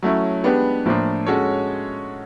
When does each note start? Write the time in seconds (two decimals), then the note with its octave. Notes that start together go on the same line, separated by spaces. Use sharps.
0.03 F#3 A3 C#4 E4
0.44 G#3 B3 D4 G4 B4
0.86 A2 F3 A#3 D4
1.26 G#3 C#4 F#4 A4 C#5